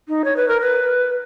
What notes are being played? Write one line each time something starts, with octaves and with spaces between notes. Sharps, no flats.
D#4
C#5
B4
A#4
B4